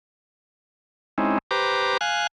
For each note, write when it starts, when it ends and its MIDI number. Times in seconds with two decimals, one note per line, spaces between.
1.18 1.38 56
1.18 1.38 60
1.18 1.38 61
1.18 1.38 63
1.18 1.38 64
1.51 1.97 67
1.51 1.97 71
1.51 1.97 72
1.51 1.97 82
1.51 1.97 86
2.01 2.27 77
2.01 2.27 80
2.01 2.27 90